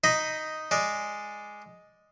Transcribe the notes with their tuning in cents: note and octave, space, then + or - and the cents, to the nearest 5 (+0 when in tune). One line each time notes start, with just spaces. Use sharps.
D#4 +0 D#5 +0 B5 +15
G#3 +0 D5 +0